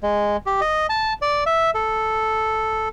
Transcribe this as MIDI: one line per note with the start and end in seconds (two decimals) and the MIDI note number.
0.03 0.37 56
0.46 0.60 67
0.61 0.87 75
0.89 1.13 81
1.22 1.44 74
1.46 1.70 76
1.75 2.88 69